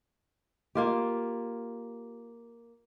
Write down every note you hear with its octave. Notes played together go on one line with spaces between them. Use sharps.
A#3 F4 G4